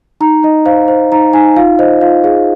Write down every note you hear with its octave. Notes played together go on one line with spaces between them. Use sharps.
D#4 A#5
D#4 D#5
C5 F5
C5
D#4 A#5
D#4 G#5
F4 F5
C5 D#5
F4 F5
G#4 F5